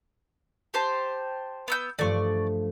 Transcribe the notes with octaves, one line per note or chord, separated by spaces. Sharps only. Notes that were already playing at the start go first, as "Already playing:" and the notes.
G4 C5 A5
B3 E6 G6
G2 F3 A3 D5 C#6